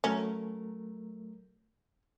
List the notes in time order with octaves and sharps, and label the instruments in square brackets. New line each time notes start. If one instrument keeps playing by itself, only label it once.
[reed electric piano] F#3 A3 A#4 [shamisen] C#4